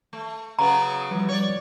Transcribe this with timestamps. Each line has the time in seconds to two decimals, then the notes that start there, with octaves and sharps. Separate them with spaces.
0.13 A3
0.59 C#3 F#3 B3 A#5
0.82 D#6
1.11 E3 F3 G3
1.29 C#5 D5